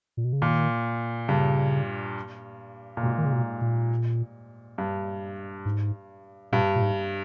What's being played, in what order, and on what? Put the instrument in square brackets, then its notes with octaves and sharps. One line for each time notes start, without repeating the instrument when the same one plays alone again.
[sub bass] A#2
B2
C#3
[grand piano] A#2 [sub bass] D#3
[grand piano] G2 [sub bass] C#3
[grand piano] A#2
[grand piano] G#2 [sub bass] B2
[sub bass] D#3
C#3
B2
A#2
[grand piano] G2
[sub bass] G#2
[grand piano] G2 [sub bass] A#2
[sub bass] A#2
G#2